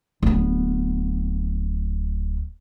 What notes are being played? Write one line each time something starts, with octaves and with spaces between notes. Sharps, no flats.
D1 B3